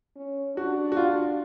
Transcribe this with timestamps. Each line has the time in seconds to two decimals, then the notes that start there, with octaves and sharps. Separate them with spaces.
0.16 C#4
0.56 D4 F#4
0.92 F#4
0.97 F4